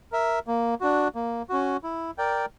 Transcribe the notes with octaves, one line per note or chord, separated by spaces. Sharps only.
A#4 E5
A#3
D4 F#4
A#3
C#4 F#4
E4
A#4 D5 G5